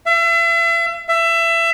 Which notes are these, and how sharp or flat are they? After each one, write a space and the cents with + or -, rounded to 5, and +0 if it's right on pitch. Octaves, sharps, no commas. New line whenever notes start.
E5 +40
E5 +25